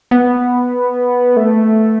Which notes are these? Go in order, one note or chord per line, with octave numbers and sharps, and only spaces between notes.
B3
A3